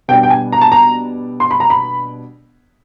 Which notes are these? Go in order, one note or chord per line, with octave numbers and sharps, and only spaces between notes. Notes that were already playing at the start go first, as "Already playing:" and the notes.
B2 G3 B3 D4 G5
G5
G#5
A#5
A5
A#5
C6
B5
A#5
B5